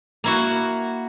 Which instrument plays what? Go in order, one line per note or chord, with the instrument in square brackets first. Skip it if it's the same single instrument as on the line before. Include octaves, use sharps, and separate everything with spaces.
[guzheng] A#3 E4 F#4